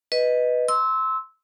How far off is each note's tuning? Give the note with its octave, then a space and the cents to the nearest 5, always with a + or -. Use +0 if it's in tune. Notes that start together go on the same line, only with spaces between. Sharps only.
B4 +0 D#5 +0
C6 +0 E6 -20